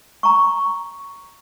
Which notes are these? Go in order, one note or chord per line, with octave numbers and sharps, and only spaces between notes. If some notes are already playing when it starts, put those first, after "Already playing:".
A#5 C#6